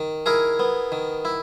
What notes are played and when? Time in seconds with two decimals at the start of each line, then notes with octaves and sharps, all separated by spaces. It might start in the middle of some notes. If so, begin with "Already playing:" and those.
Already playing: D#3
0.26 E4 G#4 A#4
0.59 B3
0.92 D#3
1.25 E4